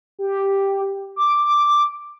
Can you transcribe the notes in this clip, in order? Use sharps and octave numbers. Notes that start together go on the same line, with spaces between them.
G4
D6